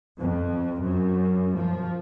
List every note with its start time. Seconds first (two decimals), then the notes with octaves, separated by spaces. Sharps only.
0.20 F2
0.84 F#2
1.59 F3